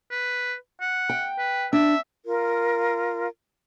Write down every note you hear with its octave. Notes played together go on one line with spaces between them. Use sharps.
B4
F#5
G5
B4
D4 E5
F4 A#4